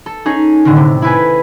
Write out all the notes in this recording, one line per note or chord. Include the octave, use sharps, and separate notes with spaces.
A4
C#4 D#4 G#4
A2 D3 D#3
C3
E4 B4 G#5